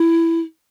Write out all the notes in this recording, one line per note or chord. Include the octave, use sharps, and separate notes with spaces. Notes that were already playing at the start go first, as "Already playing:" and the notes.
Already playing: E4